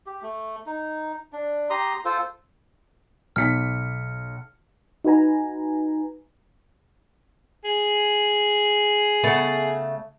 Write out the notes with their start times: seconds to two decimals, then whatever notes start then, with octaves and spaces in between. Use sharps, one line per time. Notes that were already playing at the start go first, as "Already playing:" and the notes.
0.06 G4
0.22 A3
0.66 D#4
1.33 D4
1.70 G4 A#5 C6 D#6
2.05 F4 A4 C5
3.36 B1 F6 B6 C#7
5.04 D#4 F#4 B4 G#5 A#5
7.64 G#4
9.23 C#3 A3 B3